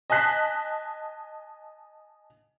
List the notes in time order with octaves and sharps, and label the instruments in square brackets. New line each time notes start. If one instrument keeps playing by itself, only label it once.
[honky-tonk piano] D#5 G#5 A5 F#6 B6